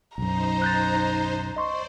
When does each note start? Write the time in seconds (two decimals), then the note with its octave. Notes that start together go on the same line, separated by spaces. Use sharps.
0.18 B1 F#2 D#4 C5 A#5
0.62 F#6 G6 A6
1.56 C5 D5 D#5 C6 C#6